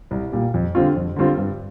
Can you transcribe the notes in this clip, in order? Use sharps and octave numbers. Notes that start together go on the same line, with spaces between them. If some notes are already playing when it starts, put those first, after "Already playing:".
C2
A#2 G3
F2
D3 G3 C4 F4
F2
D3 G3 C4 F4
G2